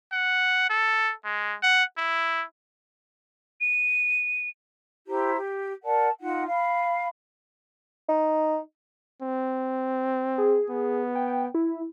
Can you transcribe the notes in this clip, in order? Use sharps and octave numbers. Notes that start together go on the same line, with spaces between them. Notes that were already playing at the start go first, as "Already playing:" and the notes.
F#5
A4
G#3
F#5
E4
D#7
E4 G4 C5 A#5
G4
A#4 D5 F#5 A5
D#4 F4 F#5
F5 B5
D#4
C4
G#4
B3
G5
E4